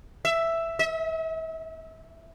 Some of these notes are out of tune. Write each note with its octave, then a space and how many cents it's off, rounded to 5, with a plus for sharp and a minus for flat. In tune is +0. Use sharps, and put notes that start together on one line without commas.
E5 +5
E5 -40